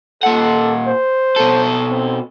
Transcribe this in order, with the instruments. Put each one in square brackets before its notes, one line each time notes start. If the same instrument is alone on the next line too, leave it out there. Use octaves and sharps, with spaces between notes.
[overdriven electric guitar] A#2 F#5 [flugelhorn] A4
[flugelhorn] C5
[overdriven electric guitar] B2 A4
[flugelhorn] C4